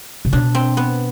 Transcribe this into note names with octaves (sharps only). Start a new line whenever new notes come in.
C3
B2 D4
C4
B3